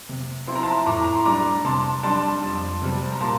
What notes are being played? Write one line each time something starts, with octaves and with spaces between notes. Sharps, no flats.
C3
F3 C4 E4 C6
A#5
A5 C6
A2 A#5 D6
A#5
C6
G3 D4 A#5 D6
C3 A5 C6
G3 D4 A5 C6
F2
C3 G3 C4
A#5
A#2 A5 C6